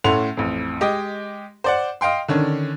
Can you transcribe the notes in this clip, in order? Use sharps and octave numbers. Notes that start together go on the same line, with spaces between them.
A2 A3 C#4 F#5 C6 F7
A1 F2
G#3 G4 D#5
C5 D5 F#5
D#5 F5 G5 C6
D3 D#3 C#4 D4